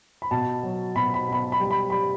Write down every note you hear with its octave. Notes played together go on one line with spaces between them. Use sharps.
B5
B2 A5
F#3
B2 B5
B5
B2 B5
B5
G3
B5
G3 B5